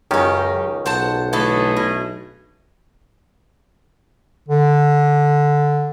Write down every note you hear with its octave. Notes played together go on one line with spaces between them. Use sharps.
C#2 F#2 D#3 C#4 D#4 G4
B1 C5 F#5 A5
D3 E3 A3 B3 G#4 A4
B2
D3